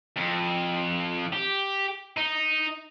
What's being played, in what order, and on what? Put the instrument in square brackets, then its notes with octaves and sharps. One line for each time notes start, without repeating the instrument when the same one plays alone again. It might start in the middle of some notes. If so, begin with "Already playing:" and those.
[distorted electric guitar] F2
G4
D#4